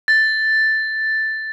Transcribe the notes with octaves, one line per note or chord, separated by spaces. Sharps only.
A6